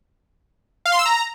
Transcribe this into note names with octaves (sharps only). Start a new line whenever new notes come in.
F5
C6
E6
A#5